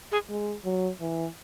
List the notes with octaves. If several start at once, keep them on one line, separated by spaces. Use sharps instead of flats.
G#4
G#3
F#3
E3